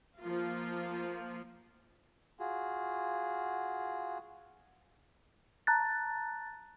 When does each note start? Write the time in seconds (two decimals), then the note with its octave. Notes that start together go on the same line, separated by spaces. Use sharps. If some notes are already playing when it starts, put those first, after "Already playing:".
0.18 F3 A#3 F4
2.39 F4 F#4 G#4
5.67 A5 A#5 F#6 A6